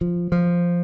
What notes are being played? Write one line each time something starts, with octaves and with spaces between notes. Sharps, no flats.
F3
F3